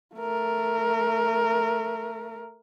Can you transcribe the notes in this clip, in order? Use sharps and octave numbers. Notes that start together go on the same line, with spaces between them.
A3 A#4